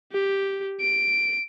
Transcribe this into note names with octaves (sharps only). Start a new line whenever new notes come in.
G4
D7